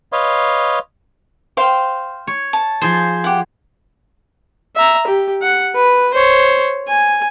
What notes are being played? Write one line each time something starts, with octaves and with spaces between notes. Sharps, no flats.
B4 C#5 D#5 F5 C6
C5 F5 G5
C#5
A5
F3 G#4 C5
G4 F#5
E5 A#5
G4
F#5
B4
C5 C#5
G#5